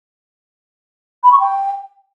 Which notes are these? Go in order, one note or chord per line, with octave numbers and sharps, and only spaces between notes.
B5
C#6
G5